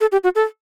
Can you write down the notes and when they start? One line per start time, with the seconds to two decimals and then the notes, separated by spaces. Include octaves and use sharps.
0.01 A4
0.12 G4
0.24 F#4
0.35 A4